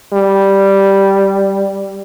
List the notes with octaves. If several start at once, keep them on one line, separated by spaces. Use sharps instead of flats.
G3